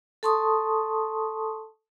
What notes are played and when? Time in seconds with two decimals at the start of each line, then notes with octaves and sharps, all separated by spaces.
0.23 A4 A5 C6 C#6 D#6